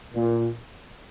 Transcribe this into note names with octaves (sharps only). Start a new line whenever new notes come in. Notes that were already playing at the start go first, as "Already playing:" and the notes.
A#2